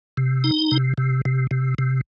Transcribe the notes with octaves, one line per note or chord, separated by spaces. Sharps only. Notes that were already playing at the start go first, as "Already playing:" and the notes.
C3
D#4
C3
C3
C3
C3
C3